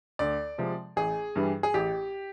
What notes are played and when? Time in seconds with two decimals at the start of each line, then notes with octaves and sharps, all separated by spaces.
0.19 D2 D5
0.58 C3 F3 G#3
0.96 A1 G#4
1.36 G2 E3 G3
1.63 G#4
1.74 A1 G4